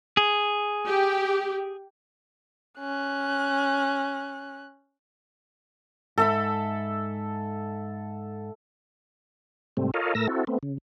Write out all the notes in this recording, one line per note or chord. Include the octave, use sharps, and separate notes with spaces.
G#4
G4
C#4 F#6
G#2 A4 E5 B5
G#2 C3 G3 A3 C4
F4 A4 A#4 C#5 D#5 F5
A2 A3 A#4 E6 A#6
C4 E4 F#4 A4
A3 B3 C4
C#3